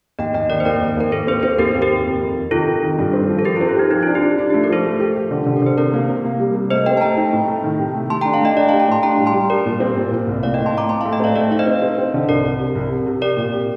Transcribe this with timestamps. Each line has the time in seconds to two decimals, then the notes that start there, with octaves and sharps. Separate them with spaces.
0.19 D#2 D#5 G5
0.34 D#2 D#5 G5
0.50 D#3 A#4 D5
0.60 C5
0.65 D#2 A#4 D5
0.81 D#2
0.97 D#2 A#4
1.12 D#2 A4 C5
1.27 C4 A4 C5
1.43 C4 A4 C5
1.58 D#2 G4 A#4
1.75 D#2
1.82 G4 A#4
1.90 D#2
2.06 F2
2.21 F2
2.36 F2
2.51 D#3 F4 A4
2.67 F2
2.83 D#3
2.99 G2
3.13 C4
3.29 F3
3.39 A4
3.45 F3 G4 A#4
3.56 C4 F4 A4
3.69 F4
3.76 D#4 G4
3.91 F3 D#4
4.03 D4 F4
4.15 G4
4.22 D4
4.38 D4 F4
4.50 A3 G4
4.64 A#4
4.70 F3 A4 C5
4.85 A3
5.00 G4
5.16 G4
5.31 D3
5.46 D3
5.56 A#4
5.62 D3 C5
5.77 C3 A#4 D5
5.94 A#3
6.09 C3
6.25 A#3
6.40 G3
6.55 C3
6.71 A3 C5 D#5
6.86 C4 D#5 G5
6.97 A5
7.01 A3 G5 A#5
7.17 D#4
7.33 A2
7.48 A3
7.64 D#3
7.79 C3
7.94 A3
8.10 A3 A5 C6
8.21 D4 G5 A#5
8.33 F5 A5
8.41 A3 D#5 G5
8.56 D4 D5 F5
8.68 G4 F5 A5
8.80 G5 A#5
8.88 A2 A5 C6
9.03 D4 G5 A#5
9.19 G3
9.26 A5 C6
9.34 G3
9.50 G3 A#4 D5
9.66 A#2
9.80 C4
9.96 A#2
10.11 A#2
10.27 C2
10.43 A2 D5 F5
10.54 A2 D#5 G5
10.66 A5 C6
10.73 A2 A#5 D6
10.84 A#5
10.89 A2 A5 C6
11.01 A3 F5 A5
11.12 D#5 G5
11.20 C4 D5 F5
11.35 A3 D5 F5
11.51 D#4 F5
11.59 C5 D#5
11.67 C4
11.82 C4
11.98 C4
12.14 D3
12.29 C2 A#4 D5
12.45 C2
12.60 C3
12.75 C2
12.92 C3
13.06 C3
13.21 G4 A#4 D5
13.37 A#2
13.53 G4